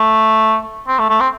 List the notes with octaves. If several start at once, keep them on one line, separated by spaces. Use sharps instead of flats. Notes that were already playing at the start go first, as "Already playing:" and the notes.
Already playing: A3
C4
A3
A3
C4